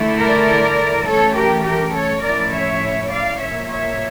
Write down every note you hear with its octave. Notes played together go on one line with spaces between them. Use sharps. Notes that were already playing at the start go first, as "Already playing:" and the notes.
Already playing: D3 A3 E4
A#4 D5
E3 A3 C#4 A4 C#5
G4 A#4
G4 A#4
A4 C#5
A2 F3 C#4 E4 A#4 D5
C#5 E5
D5 F5
A#2 F3 A#3 C#5 E5
C#5 E5